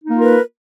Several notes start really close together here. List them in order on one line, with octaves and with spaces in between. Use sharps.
D#4 A#3 F4 A#4 B4